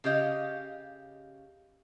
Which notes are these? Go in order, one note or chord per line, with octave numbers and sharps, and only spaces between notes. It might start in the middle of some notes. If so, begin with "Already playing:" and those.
C#3 G4 D#5 F5